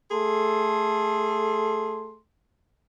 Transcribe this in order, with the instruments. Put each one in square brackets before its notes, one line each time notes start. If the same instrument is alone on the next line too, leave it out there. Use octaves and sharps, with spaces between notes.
[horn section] A3 G#4 A4 C6